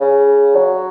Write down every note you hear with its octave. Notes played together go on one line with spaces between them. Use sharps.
C#3
F#3